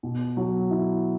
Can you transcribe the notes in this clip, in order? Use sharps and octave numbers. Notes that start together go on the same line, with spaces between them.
B2
F#3
E4